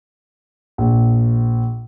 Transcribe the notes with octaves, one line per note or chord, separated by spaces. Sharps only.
A#1